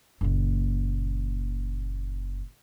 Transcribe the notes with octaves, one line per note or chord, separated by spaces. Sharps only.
F#1 A#2